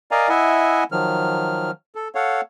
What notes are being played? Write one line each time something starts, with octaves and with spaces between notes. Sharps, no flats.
A#4 D5 D#5 F5 G#5 A#5
E4 D#5 E5 F#5 G#5
D#3 F3 F#3 F6
A4
A4 C#5 F5 F#5